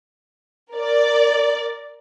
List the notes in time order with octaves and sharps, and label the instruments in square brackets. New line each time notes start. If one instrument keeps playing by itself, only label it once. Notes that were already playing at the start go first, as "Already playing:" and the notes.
[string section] A#4 D5